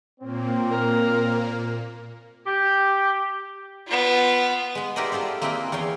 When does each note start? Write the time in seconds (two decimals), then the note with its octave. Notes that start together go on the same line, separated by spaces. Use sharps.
0.20 A#2 A#3 C4 C#5
0.70 A#4
2.45 G4
3.87 B3 F4
4.75 G#3 B3
4.96 E4 G4 A#4 C5 D5 D#5
5.12 F4 A4 C5 D5
5.41 A#3 C4 E4 G#4 B4 G5
5.72 E2 G#4 C#5 F5 G5 C6